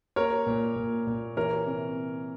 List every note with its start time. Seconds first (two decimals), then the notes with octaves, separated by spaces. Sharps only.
0.16 A#3 A#4 C#5
0.46 A#2
0.76 A#2
1.07 A#2
1.37 E3 A#4 C#5
1.66 C3